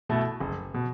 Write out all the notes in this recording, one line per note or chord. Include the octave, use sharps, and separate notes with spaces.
B2 A3 E4 A4
F#1
B2